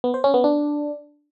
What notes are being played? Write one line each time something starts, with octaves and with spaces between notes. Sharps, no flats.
B3
C5
C#4
B3
D4